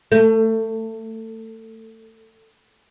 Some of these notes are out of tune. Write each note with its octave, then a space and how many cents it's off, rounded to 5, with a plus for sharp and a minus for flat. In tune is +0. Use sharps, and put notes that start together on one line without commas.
A3 +25